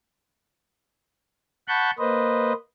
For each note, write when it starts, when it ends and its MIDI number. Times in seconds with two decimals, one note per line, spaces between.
1.68 1.90 78
1.68 1.90 81
1.68 1.90 83
1.68 1.90 85
1.68 1.90 90
1.68 1.90 91
1.99 2.53 58
1.99 2.53 71
1.99 2.53 72
1.99 2.53 75